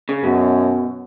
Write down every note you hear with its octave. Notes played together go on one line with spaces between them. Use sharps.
C#3
F#2 B2